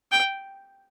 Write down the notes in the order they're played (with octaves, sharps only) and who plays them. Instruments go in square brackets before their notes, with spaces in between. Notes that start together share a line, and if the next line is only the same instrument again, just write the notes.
[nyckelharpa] G5